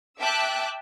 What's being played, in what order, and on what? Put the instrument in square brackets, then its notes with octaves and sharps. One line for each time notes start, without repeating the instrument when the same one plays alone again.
[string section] E5 G5 A5 D6 E6 F#6